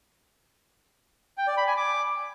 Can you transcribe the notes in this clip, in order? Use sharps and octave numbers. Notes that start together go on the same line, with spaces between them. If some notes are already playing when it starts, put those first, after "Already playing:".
G5
D5
B5
G#5
D6